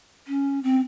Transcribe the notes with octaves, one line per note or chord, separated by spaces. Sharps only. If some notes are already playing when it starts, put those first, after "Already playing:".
C#4
C4